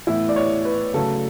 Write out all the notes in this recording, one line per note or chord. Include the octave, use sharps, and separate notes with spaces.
A2 E3 B3 E4
D5
C#5
B4
C#3 F#3 A3 A4